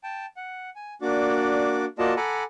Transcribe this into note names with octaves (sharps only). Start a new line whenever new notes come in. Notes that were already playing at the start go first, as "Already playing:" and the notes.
G5 A5
F#5
G#5
A#3 D4 F#4 D5 D6
A#3 F4 F#4 D5 D#5 A5
A4 F#5 G#5 A#5 B5 D6